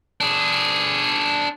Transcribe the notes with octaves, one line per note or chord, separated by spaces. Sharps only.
D4 G#4